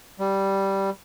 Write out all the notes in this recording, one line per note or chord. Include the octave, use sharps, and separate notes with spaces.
G3